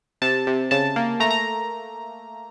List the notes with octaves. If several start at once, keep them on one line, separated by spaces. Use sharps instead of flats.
C3 A5
C3
C#3 A5
A#3
A3 A#5
A#5